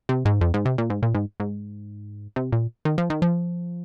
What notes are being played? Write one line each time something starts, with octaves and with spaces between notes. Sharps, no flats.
C3
G#2
F2
G#2
C3
A#2
G#2
A#2
G#2
G#2
C3
A#2
D#3
F3
D#3
F3